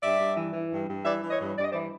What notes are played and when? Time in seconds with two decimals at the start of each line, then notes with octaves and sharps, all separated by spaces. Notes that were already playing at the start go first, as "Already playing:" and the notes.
0.02 G2 D5 E5
0.20 G2
0.37 E3
0.54 E3
0.72 G2
0.88 G2
1.05 E3 D5 E5
1.23 E3
1.31 C#5 D#5
1.40 G2
1.58 G2 D5
1.65 D#5
1.71 C5 D5
1.74 E3